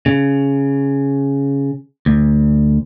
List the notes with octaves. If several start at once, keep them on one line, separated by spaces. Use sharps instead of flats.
C#3
D2